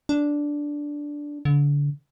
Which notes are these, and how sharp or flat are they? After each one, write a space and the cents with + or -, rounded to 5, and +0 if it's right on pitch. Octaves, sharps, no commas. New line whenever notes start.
D4 -5
D3 -30